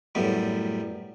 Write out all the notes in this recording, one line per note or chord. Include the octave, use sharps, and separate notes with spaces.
F#2 A2 G3 B3